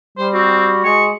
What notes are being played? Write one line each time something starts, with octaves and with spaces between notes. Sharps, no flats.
G3 C5
C4 F#4
G#3 C#6